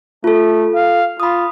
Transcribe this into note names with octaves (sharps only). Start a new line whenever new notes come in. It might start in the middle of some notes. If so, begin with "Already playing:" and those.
A3 F4 A4
F5
F4 B5 D#6